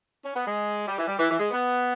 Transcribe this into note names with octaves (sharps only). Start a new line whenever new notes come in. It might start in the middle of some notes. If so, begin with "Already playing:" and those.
C#4
B3
G#3
G3
E3
G3
E3
E3
G#3
B3